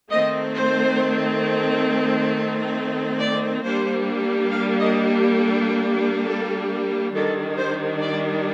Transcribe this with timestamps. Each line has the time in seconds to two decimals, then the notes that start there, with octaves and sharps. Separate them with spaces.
0.11 D#3 A3 C4 D#5
0.55 C5
3.19 D5
3.63 G3 A#3 D4 C5
4.51 F5
4.80 D#5
5.09 G4
5.38 A4
6.26 A4
7.14 D#3 G3 D4 A4
7.58 C5
8.01 D5